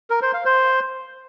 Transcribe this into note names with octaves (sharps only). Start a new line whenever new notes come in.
A#4
C5
F5
C5